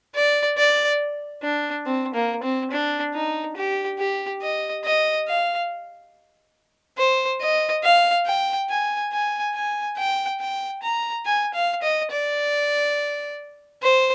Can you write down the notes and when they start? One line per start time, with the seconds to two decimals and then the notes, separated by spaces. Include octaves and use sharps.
0.15 D5
0.58 D5
1.42 D4
1.86 C4
2.14 A#3
2.43 C4
2.71 D4
3.14 D#4
3.56 G4
3.99 G4
4.42 D#5
4.85 D#5
5.28 F5
6.98 C5
7.41 D#5
7.83 F5
8.26 G5
8.70 G#5
9.12 G#5
9.55 G#5
9.98 G5
10.40 G5
10.83 A#5
11.25 G#5
11.54 F5
11.82 D#5
12.11 D5
13.83 C5